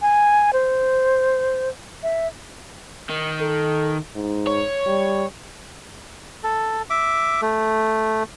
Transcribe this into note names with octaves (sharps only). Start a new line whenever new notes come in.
G#5
C5
E5
D#3
A4
G#2
C#5
G3
A4
E5 D6
A3